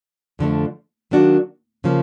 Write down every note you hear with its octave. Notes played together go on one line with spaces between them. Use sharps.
F2 D3 F3 A3
D#3 F#3 A#3 D4 F#4
C#3 F3 A#3